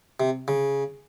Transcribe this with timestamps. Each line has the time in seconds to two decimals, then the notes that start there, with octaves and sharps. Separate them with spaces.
0.20 C3
0.48 C#3